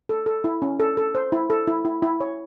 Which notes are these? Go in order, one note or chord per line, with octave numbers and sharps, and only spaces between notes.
A4
A4
E4
C#4
A4
A4
C5
E4
A4
E4
E4
E4
C#5